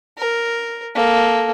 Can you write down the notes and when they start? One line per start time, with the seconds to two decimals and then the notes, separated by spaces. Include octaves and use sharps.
0.18 A#4
0.95 A#3 A4